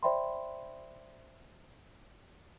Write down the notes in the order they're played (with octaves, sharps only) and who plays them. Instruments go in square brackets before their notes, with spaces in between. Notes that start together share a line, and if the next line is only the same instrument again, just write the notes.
[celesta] C5 D5 E5 G5 B5 C6